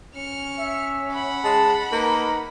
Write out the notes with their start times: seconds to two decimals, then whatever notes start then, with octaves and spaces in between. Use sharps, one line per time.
0.16 C#4 F6 C#7
0.59 E5
1.12 F#5 B5
1.44 G#3 A5
1.92 A#3 D#4 B4